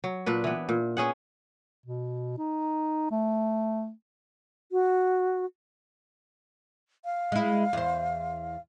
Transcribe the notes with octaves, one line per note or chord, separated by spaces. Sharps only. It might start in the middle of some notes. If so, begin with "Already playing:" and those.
F#3
A#2 D4 B4
E3 B3
A#2
B3 C#4 G#4 F#5
B2
D#4
A3
F#4
F5
G#3 E4
E2 C5